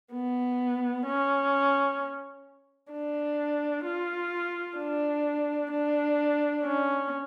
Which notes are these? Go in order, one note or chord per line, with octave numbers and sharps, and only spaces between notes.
B3
C#4
D4
F4
D4
D4
C#4